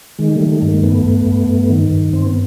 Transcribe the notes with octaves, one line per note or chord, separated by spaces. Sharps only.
D#3 G#3
D#3 G3 A3
G3 A3
G2
G#3 A#3
G2 A3 B3
G2
G2
G2
D#3
G2
G2 C4
B3